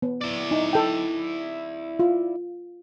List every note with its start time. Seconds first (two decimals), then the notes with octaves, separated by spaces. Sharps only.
0.02 B3
0.21 E4 D5
0.51 D#4
0.73 A4 G5
1.99 F4